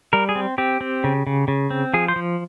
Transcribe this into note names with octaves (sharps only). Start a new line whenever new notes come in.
G3 A#4
G#4
C4
C4 G4
C4
C#3
C#3
C#3
C4
F3 G#4
C5
F3